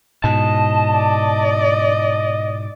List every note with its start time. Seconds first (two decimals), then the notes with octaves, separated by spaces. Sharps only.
0.24 G#2 B2 D#5 A5
0.94 D5